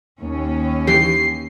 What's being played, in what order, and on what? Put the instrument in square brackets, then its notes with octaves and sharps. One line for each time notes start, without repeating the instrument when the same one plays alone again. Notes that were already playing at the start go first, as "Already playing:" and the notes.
[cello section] D#2 C#4
[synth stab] E3 G4 [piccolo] C7